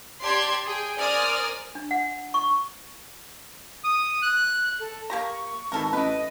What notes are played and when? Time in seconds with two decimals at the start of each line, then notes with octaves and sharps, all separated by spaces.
0.21 G4 D5 A5 C6 G#6
0.65 G#4 G5
0.98 A#4 C5 D5 G#5 D#6 F6
1.75 D4
1.91 F#5
2.34 C#6
3.84 D#6
4.22 F#6
4.80 A4
5.10 A#3 G4 A#5 C#6
5.72 G#1 B2 A4 A#4
5.93 A1 E4 B4 D#5